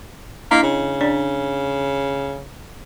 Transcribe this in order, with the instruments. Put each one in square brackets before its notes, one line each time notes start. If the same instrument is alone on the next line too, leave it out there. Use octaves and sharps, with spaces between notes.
[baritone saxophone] A#3 [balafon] D4 E4 D#5
[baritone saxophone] C#3
[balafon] D4 D5